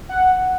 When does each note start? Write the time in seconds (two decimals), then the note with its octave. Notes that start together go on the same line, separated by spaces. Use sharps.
0.09 F#5